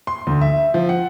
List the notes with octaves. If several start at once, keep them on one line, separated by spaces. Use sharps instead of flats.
C6
D2
E5
F3
F#5